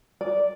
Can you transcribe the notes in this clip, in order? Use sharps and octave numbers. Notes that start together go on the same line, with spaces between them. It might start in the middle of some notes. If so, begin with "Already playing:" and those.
D5